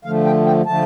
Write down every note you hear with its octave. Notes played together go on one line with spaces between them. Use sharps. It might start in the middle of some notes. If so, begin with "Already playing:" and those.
D3 F3 A3 F5
G5
G5
D3 F3 A3 A5